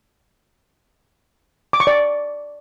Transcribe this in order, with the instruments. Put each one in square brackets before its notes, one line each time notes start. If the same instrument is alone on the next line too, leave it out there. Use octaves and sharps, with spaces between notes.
[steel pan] D6
C#6
D5